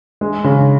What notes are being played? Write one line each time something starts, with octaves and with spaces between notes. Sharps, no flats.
G#3
C#3